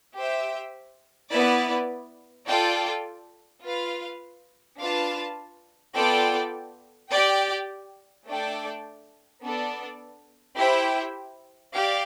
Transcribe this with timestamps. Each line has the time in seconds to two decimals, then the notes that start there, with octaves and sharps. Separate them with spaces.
0.16 G4 C5 E5 G5
1.32 B3 E4 B4 D5
2.48 F4 A4 D5 G5
3.63 F4 B4 F5
4.79 D4 F4 B4 F5 A5
5.95 B3 F4 A4 D5 G5
7.11 G4 D5 G5
8.27 A3 D4 A4 D5 G5
9.43 B3 D4 A4 D5
10.58 E4 G4 C5 E5 G5
11.74 G4 D5 F5